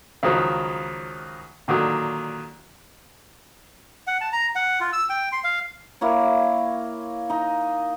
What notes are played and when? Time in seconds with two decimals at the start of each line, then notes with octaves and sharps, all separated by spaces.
0.23 C#2 D#3 F3 F#3
1.68 A#2 D3 D#3 F#3
4.07 F#5
4.21 A5
4.33 A#5
4.55 F#5
4.80 F4
4.93 E6
5.10 G5
5.32 C6
5.44 F5
6.01 A#3 E4 C#5
7.30 D#4 A#5